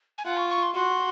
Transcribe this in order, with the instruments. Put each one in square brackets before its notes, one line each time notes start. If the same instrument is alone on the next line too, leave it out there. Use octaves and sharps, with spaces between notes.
[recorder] G#5
[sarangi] F4 [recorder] F#5
[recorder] C#6
C#6
C6
[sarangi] F#4 [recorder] C6